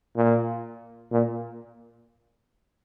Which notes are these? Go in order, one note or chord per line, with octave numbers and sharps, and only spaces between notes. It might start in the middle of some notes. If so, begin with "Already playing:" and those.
A#2
A#2